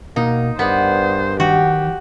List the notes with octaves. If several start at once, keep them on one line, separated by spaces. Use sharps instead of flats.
B2 A#3 D#4
G2 B3 A#4 C5 D5
D#3 F#3 F#4 G4